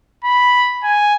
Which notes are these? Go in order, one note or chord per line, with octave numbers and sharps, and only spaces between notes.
B5
G#5